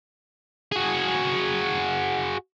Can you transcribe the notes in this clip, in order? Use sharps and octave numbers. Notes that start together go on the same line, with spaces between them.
F#4 G#4